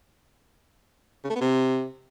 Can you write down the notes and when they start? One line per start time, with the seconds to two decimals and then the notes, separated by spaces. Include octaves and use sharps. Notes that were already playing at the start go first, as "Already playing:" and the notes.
1.24 C#3
1.30 A3
1.35 B3
1.41 C3